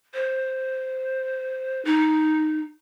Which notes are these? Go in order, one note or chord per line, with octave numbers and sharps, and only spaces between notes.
C5
D#4